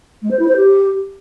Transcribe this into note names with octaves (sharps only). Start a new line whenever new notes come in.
G#3
C5
E4
C5
G4